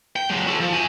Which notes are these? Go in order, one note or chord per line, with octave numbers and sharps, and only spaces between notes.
G5
F#3 G#3
F#4 A4
F3
F#4 G#5